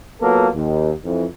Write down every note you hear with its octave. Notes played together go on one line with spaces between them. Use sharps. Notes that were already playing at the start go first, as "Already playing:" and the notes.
F#3 A#3 B3 F4 A4 B4
D#2
F2 E3